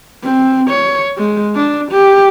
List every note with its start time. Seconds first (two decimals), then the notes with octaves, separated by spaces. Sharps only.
0.23 C4
0.70 C#5
1.18 G#3
1.56 D4
1.92 G4